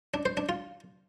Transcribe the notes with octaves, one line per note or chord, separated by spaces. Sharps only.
D4
C5
D4
F4